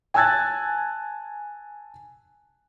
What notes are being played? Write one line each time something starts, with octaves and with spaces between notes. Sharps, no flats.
G#5 A5 E6 F#6 G#6 A6